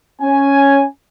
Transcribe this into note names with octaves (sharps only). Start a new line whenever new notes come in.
C#4 G#5